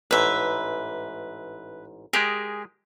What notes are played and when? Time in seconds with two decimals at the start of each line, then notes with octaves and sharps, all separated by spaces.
0.11 A1 G#2 B4 E5
2.13 G#3 G4 G#4 A#4